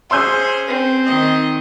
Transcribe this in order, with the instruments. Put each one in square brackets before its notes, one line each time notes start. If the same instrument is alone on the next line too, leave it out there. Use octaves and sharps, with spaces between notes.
[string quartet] C#4 G#4 C5 [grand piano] C6 E6 G6
[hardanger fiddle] C4
[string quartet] D#3 D#5